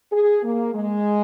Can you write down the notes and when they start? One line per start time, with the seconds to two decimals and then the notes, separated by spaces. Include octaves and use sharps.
0.12 G#4
0.43 A#3
0.74 G#3